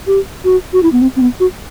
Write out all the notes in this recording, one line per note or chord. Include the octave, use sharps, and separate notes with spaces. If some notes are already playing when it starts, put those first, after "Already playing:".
G4
F#4
F#4
E4
B3
C4
C4
B3
F#4